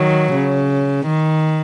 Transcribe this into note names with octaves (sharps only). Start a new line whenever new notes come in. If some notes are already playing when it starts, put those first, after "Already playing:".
Already playing: D#3 F#3
C#3
D#3